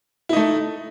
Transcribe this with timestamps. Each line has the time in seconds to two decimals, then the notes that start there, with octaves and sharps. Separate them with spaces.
0.29 E4
0.33 D#4
0.37 A3